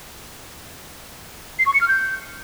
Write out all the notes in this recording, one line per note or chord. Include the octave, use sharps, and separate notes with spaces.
C7
C#6
C#7
F6
G6